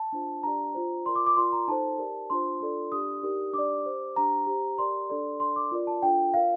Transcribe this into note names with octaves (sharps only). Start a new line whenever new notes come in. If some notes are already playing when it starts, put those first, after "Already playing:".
Already playing: A5
D4 F4 C5
D4 G4 D5 A#5
F4 C5
F4 A#4 D5 C6
D6
D6
F4 A#4 D5 C6
A#5
D#4 A4 C5 A5
G4 A#4 D5
D4 F4 C5 C6
D4 F4 A4 D5
D4 G4 D5 D#6
D#4 G4 A#4 D5
D4 G4 D5 D6
G4 C5
D4 G4 C5 A#5
G4 C5
G4 A#4 D5 C6
D4 A4 D5
D4 A4 D5 C6
D6
F4 A#4 D5
A5
D4 F4 A4 G5
F4 A#4 D5 F5